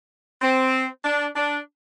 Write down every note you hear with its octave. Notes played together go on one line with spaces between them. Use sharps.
C4
D4
D4